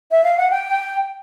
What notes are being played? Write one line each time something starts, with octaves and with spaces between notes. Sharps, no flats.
E5
F5
F#5
G5